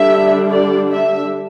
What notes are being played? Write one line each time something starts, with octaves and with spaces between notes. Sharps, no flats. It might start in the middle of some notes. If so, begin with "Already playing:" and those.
Already playing: D3 G3 D4 E5
D5
E5